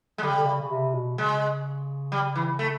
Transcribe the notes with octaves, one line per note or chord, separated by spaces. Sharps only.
G#3
D3 G3
C#3
D3
C#3
C#3
C3
B2
C#3 G#3
G3
E3
A3